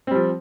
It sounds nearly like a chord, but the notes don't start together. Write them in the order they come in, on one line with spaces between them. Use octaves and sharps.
C4 G3 F3